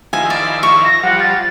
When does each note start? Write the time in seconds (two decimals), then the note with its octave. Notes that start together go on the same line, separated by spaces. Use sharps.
0.13 D#3 F3 E4 G#5
0.30 D5
0.63 C#6
0.85 A#6
1.03 F3 G3 F#5
1.20 A6